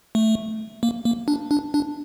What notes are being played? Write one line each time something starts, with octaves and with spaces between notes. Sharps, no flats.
A3
A#3
A#3
D4
D4
D4